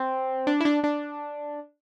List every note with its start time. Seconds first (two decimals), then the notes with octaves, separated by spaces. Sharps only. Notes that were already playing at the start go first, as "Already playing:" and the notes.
Already playing: C4
0.47 D4
0.60 E4
0.65 D4
0.84 D4